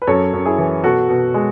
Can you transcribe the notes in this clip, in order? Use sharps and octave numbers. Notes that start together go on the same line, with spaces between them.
B4
F#2 A4 C#5
F#2
E4 G#4
E3
B2 F#4 A4
B2
G#3